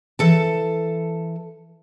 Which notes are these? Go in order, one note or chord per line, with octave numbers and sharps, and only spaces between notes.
E3 A4 A5